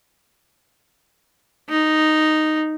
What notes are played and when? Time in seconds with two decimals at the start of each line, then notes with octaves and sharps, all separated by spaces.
1.69 D#4